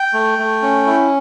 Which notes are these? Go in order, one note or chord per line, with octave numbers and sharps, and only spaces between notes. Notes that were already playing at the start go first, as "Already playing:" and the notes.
Already playing: G5
A3
A3
C#4
E4